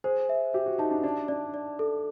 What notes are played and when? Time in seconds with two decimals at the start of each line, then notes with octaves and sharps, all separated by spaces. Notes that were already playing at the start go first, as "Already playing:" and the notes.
0.04 G#4 C5
0.29 E5
0.53 G4 E5
0.66 F#4
0.78 D#4 A5
0.91 D4
1.03 D4 D5
1.28 D4 D5
1.54 D5
1.79 A4